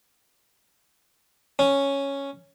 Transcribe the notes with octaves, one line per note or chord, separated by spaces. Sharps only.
C#4